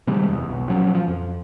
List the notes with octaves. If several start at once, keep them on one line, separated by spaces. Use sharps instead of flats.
C3 D#3 G3 G#3
F#1 E2
B1
A#2 F3 F#3 C#4
F3
F2